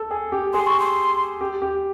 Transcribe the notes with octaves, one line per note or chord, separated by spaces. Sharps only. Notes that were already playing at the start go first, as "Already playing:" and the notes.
Already playing: A4
G#4
G4
G#4 C6
C#6
C6
G4
G4